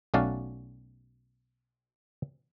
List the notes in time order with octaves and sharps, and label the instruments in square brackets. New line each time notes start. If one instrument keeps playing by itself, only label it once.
[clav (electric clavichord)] B1 A3 C#4 F#4 D5 F5